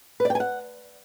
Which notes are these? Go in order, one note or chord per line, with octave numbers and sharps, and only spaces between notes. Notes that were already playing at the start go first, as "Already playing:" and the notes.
B4
D5
G5
G#5
F#5